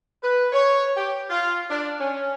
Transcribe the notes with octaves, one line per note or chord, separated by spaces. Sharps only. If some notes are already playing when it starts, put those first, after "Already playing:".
B4
C#5
G4
F4
D4
C#4